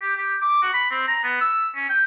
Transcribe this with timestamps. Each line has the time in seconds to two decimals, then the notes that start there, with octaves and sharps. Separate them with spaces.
0.02 G4
0.16 G4
0.42 D6
0.62 F#4
0.73 B5
0.91 C4
1.07 A#5
1.24 B3
1.41 E6
1.76 C#4
1.89 G5